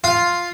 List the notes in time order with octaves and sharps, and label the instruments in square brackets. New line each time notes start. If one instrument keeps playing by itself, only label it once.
[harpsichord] F4